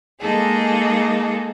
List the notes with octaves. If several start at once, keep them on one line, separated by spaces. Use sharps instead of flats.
G#3 A#3 D#4 G#4 A4